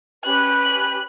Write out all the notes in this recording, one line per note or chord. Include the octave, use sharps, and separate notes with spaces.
C#4 G4 B4 F#6